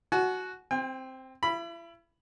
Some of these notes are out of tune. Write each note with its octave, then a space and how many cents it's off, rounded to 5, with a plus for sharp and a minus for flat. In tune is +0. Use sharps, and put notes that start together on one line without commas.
F#4 +0 G#5 +45
C4 +0 G5 +40
E4 +40 B5 +0